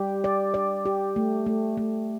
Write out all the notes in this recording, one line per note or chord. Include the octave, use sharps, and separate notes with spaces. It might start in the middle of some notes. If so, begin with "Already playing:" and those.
Already playing: G3 G4
D5
D5
G4
A3
A3
A3